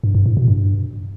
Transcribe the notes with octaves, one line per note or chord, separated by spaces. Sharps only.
G2
G2
A2
B2
G2